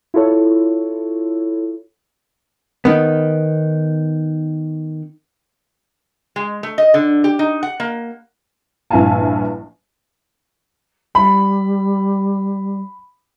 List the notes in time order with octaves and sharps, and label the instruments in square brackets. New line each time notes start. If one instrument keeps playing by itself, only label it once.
[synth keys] E4 F4 A4 C#5
[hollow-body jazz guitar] D#3 B3
[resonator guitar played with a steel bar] G#3
A3
D#5
D3
G4
D#4
F#5
A#3
[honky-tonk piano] A#1 G2 E4 F5 G#5 A5
[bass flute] G3 [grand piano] B5